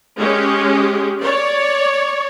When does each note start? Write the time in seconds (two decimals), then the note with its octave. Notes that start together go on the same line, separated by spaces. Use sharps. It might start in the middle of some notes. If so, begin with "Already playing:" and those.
0.17 G#3 C#4 G4
1.20 C#5 D5